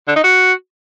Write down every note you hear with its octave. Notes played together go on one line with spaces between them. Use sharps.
D3
D#4
F#4